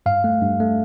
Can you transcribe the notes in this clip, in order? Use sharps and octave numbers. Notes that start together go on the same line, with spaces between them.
G2 F5
A3
G2
A3